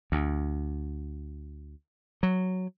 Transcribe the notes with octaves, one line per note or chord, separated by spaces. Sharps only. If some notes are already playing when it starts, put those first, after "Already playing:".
D2
F#3